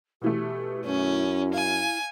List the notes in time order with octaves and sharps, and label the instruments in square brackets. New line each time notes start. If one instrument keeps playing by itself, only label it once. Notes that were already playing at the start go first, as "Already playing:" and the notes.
[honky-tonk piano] B2 E3 A3 [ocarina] G4
[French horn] F#2 [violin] C#4 [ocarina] E4
[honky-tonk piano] F5 [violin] G#5